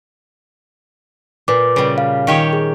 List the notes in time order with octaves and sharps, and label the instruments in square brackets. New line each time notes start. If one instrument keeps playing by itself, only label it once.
[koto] A#2 [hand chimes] B4 D6
[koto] C#3 G3
[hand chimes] F5
[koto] D#3 G4 C#5
[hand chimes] G#4